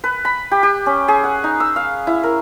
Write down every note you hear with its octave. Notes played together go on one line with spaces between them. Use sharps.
B4
B5
G4
G4
C#4
G#4
F#5
D#4
E6
F5
E4
A#4